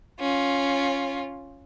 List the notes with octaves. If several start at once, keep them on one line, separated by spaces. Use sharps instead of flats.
C#4 F4